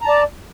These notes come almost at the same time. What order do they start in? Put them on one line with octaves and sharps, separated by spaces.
A#5 A5 D5